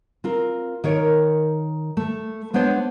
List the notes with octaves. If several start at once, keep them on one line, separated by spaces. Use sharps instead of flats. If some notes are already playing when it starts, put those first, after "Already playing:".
C4 F4 A#4
D#3 A#4 C#5
A3
G#3 B3 D4 C5 C#5 D#5